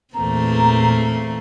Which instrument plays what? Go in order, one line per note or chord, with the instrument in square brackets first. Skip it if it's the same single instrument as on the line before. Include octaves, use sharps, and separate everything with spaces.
[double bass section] E2 A#2 E3 [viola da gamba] A3 A#3 C4 [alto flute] A#5